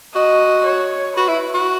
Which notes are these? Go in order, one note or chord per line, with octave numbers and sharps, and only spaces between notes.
F#4 D#5
C#5
F#4 B4
E4
F#4